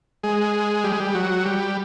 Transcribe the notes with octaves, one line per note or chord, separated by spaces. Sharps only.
G#3
G3
G#3
G3
F#3
G3